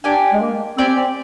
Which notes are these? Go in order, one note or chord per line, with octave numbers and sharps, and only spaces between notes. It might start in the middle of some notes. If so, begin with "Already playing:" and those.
D4 G4 D5 G#5
G#3
A#3
C4 G4 D5 G#5
C4